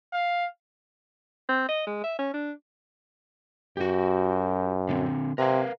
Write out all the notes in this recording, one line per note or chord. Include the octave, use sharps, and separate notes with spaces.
F5
C4
D#5
G#3
E5
C#4
D4
F#2 F#4 G4
D3 B3 C4
C3 A#4 B4 F5